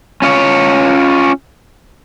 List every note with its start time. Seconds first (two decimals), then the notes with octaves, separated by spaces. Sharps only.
0.22 C#4 F4 C#5